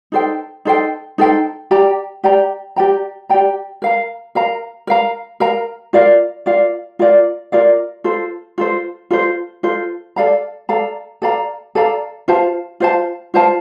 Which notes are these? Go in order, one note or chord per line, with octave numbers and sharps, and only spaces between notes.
D#4 A4 C5 G5
D#4 A4 C5 G5
D#4 A4 C5 G5
G4 D5 G5 A#5
G4 D5 G5 A#5
G4 D5 G5 A#5
G4 D5 G5 A#5
A#4 F5 A#5
A#4 F5 A#5
A#4 F5 A#5
A#4 F5 A#5
F4 A#4 D5 F5
F4 A#4 D5 F5
F4 A#4 D5 F5
F4 A#4 D5 F5
F4 A4 C5
F4 A4 C5
F4 A4 C5
F4 A4 C5
A4 D5 F5 A#5
A4 D5 F5 A#5
A4 D5 F5 A#5
A4 D5 F5 A#5
F4 C5 F5 A5
F4 C5 F5 A5
F4 C5 F5 A5